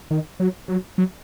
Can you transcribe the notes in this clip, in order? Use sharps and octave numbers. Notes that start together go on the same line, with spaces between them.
D#3
F#3
F#3
F#3